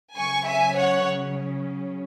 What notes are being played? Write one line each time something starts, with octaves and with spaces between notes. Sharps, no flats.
C#3 F#3 C#4 G#5 C#6
E5 G#5
C#5 F#5